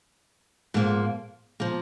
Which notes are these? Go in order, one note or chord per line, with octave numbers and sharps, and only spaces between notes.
G#2 F3 A#3
F3 A#3